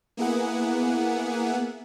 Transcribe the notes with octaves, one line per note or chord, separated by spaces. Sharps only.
A#3 B3 E4 G#4 F#5